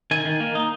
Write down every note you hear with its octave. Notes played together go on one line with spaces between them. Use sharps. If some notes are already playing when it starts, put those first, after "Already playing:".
D#3 G#5
D#3
A#3
D#4